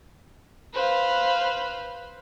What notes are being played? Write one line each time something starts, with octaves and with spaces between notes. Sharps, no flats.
B4 C5 F5